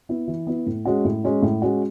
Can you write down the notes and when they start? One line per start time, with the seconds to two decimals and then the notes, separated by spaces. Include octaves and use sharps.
0.09 B3 E4
0.28 E3
0.47 B3 E4
0.66 A2
0.85 G#3 C#4 F#4
1.05 A2
1.24 G#3 C#4 F#4
1.42 A2
1.62 G#3 C#4 F#4